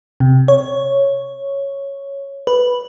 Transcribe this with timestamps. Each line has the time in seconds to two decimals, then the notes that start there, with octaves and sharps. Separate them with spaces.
0.20 C3
0.48 C#5
2.47 B4